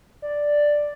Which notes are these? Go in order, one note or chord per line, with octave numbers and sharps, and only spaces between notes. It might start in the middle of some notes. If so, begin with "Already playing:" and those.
D5